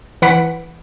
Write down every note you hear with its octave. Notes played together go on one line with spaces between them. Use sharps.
E3 F#5 B5 B6 D7